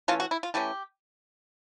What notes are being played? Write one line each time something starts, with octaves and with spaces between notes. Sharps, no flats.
E3 A3 C#4 F4
F#4
E4
F4
E3 A3 C#4 G4